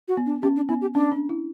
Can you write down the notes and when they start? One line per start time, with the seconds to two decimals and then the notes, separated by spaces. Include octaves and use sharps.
0.08 F#4
0.17 B3
0.26 D4
0.42 C#4 G4
0.56 D4
0.69 B3 E4
0.81 G4
0.94 C#4 D4
1.12 D4
1.29 E4